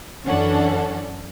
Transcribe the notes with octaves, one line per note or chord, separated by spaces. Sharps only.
F#2 E3 C#4 D4 A4 F#5